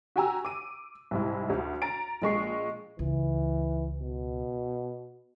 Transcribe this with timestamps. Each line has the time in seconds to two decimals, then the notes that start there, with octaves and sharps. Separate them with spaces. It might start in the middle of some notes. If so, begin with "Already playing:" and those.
0.16 F#4 G4 G5 G#5 A#5 E6
0.45 D6 D#7
1.11 C2 G#2 E4
1.50 D2
1.82 A#5 A6 D7
2.22 A#1 G#3 C#6 C7
2.99 C#2 E3
4.00 B2